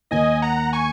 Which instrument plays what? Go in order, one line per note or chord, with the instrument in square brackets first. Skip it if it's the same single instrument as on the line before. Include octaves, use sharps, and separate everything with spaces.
[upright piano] D#2 D#3 A#3 [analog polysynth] D#5 G#5
[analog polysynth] F#5 A#5
G#5 C#6